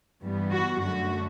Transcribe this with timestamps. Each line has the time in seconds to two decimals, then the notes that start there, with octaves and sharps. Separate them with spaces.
0.22 G2 E3 G3 B3
0.53 F#4
0.82 F#2 D3 A3 F#4